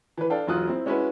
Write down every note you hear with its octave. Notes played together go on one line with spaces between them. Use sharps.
E3 B4
D4 A4 F5 G5
E1 F#3 F4 D#6 F#6
C4 E4
G#3 C#4 E4 F#4 B4